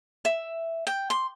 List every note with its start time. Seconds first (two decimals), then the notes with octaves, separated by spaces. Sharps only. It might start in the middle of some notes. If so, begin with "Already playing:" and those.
0.25 E5
0.87 G5
1.10 C6